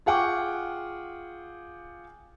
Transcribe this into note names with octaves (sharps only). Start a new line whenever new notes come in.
F4 G#4 F#5 G5 C#6 D6